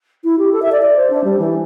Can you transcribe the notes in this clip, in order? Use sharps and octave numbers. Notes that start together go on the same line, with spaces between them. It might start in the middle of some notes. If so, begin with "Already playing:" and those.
E4
G4
A4
E5
D5
D5
C5
D4
G3
E3